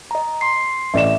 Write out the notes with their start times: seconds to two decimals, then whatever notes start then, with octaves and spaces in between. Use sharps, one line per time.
0.11 D#5 A#5
0.41 C6 C7
0.94 A1 B4 D5 E5 E7